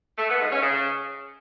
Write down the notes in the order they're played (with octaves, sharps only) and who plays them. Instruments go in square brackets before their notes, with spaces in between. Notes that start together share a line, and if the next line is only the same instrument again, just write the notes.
[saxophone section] A3
B3
G#2
C#4
C#3